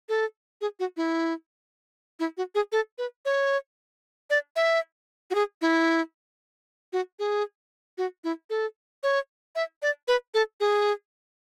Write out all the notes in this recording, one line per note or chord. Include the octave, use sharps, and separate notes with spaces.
A4
G#4
F#4
E4
E4
F#4
G#4
A4
B4
C#5
D5
E5
F#4
G#4
E4
F#4
G#4
F#4
E4
A4
C#5
E5
D5
B4
A4
G#4